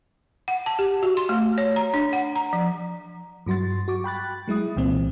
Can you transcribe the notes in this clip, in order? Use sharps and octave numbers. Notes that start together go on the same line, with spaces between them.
F#5
A5
G4
F#4
C6
A3
C#5
A#5
D4
F#5
A#5
F3
G2 F#3 F#4 C6 A6
F#4 C#6 D6
G5 B5 F#6 A6
F#3 G#3 E4 D#6
C2 A#2 E3 C4